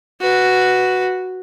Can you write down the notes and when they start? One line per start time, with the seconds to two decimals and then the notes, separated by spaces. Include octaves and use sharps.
0.21 F#4 B4